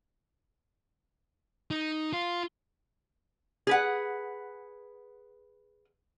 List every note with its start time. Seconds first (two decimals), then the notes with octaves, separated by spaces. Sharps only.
1.71 D#4
2.13 F4
3.67 G#4 B4 F#5